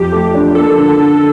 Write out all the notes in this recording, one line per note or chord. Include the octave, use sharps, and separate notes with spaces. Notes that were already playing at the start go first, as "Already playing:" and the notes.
Already playing: F2 F4 G4
A3
D4
A#3 A4
D3
D3